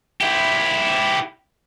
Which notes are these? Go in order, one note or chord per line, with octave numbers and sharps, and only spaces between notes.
E4 G4